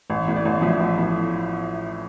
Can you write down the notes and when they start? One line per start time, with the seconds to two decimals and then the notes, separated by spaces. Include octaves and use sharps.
0.10 A1
0.28 A2
0.36 D5
0.45 A1
0.62 F3 E5
0.80 A1
0.97 A2